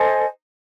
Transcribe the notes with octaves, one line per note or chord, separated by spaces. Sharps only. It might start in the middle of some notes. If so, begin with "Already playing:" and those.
Already playing: A4 C5 D#5 G#5